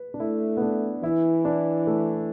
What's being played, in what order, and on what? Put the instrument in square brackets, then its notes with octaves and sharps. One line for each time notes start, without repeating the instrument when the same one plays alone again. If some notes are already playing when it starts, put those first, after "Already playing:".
Already playing: [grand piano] B4
D4
[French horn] A3 [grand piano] E4
[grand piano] B3
D4
[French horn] E3 [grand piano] E4
[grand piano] D4
A3